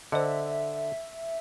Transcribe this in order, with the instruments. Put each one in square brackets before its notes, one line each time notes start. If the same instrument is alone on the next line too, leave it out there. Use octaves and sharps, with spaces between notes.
[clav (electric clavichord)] D3 [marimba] C5 D#5 [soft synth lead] E5